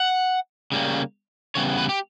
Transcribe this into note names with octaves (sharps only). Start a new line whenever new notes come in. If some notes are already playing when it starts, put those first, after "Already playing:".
Already playing: F#5
C#3 G3 A#3
E2 C#3 G3 B3 C#5
B4
G4